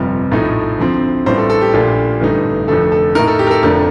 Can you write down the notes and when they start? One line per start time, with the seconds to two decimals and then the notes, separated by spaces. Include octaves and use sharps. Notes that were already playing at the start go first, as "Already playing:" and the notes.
Already playing: G1 F2 C3 G3
0.31 A#1 A2 F3 A3 D#4
0.79 D2 D3 F3 C4
1.26 A1 A2 G3 D4 F4 C5
1.38 A4
1.50 A4
1.61 G4
1.73 A#1 A#2 A3 D4 F4
2.21 A1 G2 D3 A3 D#4
2.68 F1 F2 D3 A3 A4
2.92 A4
3.15 A2 A3 D#4 A#4
3.27 A4
3.39 G4
3.47 A#4
3.51 A4
3.63 F1 F2 D3 A3 D4 A#4